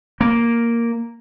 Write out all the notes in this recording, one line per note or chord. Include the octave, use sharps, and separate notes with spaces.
A#3